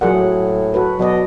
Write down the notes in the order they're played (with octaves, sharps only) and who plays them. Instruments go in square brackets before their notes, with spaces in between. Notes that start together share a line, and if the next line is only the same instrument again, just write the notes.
[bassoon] A#2 [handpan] F#3 G#4 F#5
[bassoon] A2
[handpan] F#4 A4 B4
[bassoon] B2 [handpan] F#3 D5 D#5